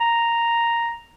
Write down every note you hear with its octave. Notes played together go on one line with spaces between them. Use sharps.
A#5